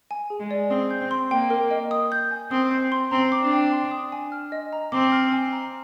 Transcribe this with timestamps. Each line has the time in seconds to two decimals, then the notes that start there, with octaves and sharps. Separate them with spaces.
0.11 G#5
0.30 G#4
0.40 G#3
0.51 D5
0.70 C4 D#6
0.91 G6
1.01 C4
1.11 C6
1.31 A#3 G5
1.50 A#4
1.71 D#5
1.91 D#6
2.12 G6
2.31 G#5
2.51 C4 D#6
2.71 G6
2.92 C6
3.11 C4 A#5
3.32 D6
3.41 D4
3.52 G5
3.72 C6
3.91 D#6
4.12 G#5
4.32 F6
4.52 D#5
4.73 A#5
4.92 C4 D6
5.12 F6
5.32 G#5
5.53 A#5